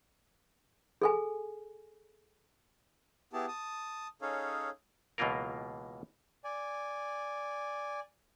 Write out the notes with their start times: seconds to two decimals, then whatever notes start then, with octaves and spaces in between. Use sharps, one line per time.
1.02 G#4 A4 G#5
3.33 B3 E4 G4 G#4 A5
3.48 A5 D#6
4.22 C#4 D#4 G#4 A4 C#5 F5
5.18 C#2 B2 E3 A#3 F4 A#4
6.44 D5 G#5